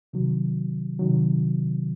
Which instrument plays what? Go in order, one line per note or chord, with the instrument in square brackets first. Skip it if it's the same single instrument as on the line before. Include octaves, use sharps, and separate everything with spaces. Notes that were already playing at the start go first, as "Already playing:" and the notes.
[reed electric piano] C2 C3 D#3 F#3
C2 C3 D#3 F#3